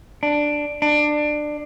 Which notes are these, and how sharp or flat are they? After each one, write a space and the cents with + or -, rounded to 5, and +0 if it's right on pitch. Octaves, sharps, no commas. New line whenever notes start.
D4 +5
D4 +20